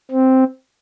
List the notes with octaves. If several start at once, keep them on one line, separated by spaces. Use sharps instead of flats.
C4